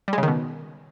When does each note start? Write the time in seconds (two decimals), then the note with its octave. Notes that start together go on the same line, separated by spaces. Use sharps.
0.08 G3
0.13 G#3
0.18 C#3
0.23 D#3
0.28 B2